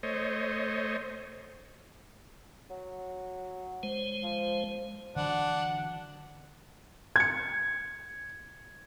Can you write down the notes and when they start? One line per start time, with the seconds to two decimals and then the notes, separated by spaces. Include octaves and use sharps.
0.03 A3 C5 C#5 D#5
2.70 F#3
3.83 G#3 C5
4.23 F3
5.16 D3 E3 F#3 D4 F#5
7.16 G#6 C#7